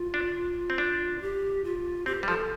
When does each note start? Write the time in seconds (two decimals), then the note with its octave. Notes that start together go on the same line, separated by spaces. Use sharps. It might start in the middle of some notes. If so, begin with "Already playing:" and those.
Already playing: F4
0.14 D4
0.70 C4
0.78 D4
1.22 G4
1.64 F4
2.06 C4 G4
2.22 G3 C5
2.28 F3 A4